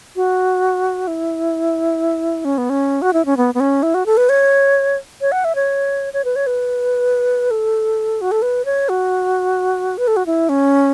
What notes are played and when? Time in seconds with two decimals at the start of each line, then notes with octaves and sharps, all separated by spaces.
0.16 F#4
1.07 E4
2.45 C#4
2.58 B3
2.70 C#4
3.02 F#4
3.13 E4
3.26 C#4
3.37 B3
3.55 B3
3.60 C#4
3.83 E4
3.94 F#4
4.06 A4
4.17 B4
4.29 C#5
5.21 C#5
5.32 F#5
5.45 E5
5.55 C#5
6.13 C#5
6.25 B4
6.36 C#5
6.47 B4
7.51 A4
8.21 F#4
8.31 A4
8.42 B4
8.65 C#5
8.89 F#4
9.98 B4
10.07 A4
10.17 F#4
10.26 E4
10.49 C#4